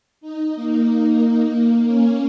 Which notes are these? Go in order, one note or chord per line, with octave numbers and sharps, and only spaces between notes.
D#4
A#3
A#3
A#3
C#4